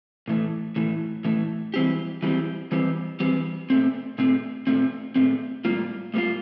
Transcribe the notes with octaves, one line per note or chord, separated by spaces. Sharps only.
A2 E3 A3
A2 E3 A3
A2 E3 A3
E3 G3 C4 G4
E3 G3 C4 G4
E3 G3 C4 G4
E3 G3 C4 G4
A#2 A3 C4
A#2 A3 C4
A#2 A3 C4
A#2 A3 C4
A2 G3 A#3 F4
A2 G3 A#3 F4